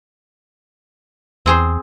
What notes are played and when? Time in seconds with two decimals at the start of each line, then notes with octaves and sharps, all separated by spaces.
1.46 E2 C4 G#4 C5